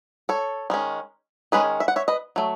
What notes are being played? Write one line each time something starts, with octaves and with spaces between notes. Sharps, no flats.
A4 C#5
D#3 G#3 C#4
D#3 G#3 C#4 G#4 B4
E5
F#5
C#5 E5
B4 D#5
F#3 A3